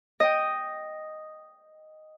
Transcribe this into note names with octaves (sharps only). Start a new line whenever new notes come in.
D#5 G5